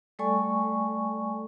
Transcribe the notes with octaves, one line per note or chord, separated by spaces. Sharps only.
G3 A3 A4 D5 G#5 C#6